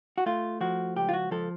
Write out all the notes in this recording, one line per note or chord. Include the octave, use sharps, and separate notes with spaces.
F#4
A3 F4
F3 F#4
C#2 G4
F4
F#4
F3 A4